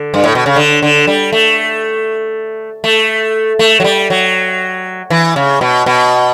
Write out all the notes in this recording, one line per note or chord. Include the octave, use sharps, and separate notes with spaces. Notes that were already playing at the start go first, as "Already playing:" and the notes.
Already playing: D3
G2
A2
B2
C#3
D3
D3
G3
A3
A3
A3
F#3
G3
F#3
E3
C#3
B2
B2